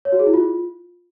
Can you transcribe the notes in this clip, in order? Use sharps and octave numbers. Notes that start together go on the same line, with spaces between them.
C#5
F#4
G#4
E4
F4